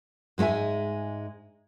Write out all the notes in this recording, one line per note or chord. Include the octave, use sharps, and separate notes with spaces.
G#2 G#3 C5 E5 G#5